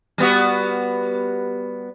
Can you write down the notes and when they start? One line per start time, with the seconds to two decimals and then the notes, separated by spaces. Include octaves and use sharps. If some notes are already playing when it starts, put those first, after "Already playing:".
0.18 G3 B3 F#4